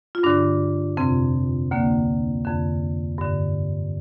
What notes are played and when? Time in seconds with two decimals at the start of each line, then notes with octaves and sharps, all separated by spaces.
0.15 F4
0.23 G2 D3 D4
0.97 F2 C3 C4
1.71 D2 D3 A#3
2.45 F2 D3
3.18 G2 D3